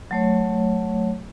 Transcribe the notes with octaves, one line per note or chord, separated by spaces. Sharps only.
F#3 A3 C#5